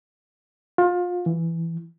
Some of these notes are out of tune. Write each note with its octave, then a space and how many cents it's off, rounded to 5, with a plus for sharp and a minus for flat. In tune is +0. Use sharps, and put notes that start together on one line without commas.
F4 +30
E3 +10